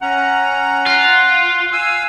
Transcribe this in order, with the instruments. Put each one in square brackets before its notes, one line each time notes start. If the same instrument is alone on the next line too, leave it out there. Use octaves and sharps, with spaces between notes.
[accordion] C#4 A#5 [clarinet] F#5
[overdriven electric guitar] F4 [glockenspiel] F#6 C7
[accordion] F5 G#5 E6